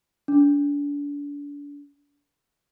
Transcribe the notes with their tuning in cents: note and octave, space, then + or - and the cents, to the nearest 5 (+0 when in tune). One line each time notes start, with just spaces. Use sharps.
D4 -35